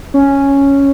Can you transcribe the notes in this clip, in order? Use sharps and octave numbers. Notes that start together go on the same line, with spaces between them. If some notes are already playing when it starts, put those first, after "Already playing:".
C#4